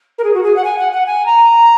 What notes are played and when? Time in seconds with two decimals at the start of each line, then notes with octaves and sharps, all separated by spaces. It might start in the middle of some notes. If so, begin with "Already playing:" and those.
0.18 A#4
0.23 G#4
0.34 F#4
0.43 G#4
0.55 F#5
0.64 G#5
0.78 F#5
0.92 F#5
1.06 G#5
1.25 A#5